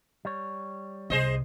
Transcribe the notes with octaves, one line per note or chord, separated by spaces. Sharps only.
G3 C#5
C2 C3 G#4 C5 D#5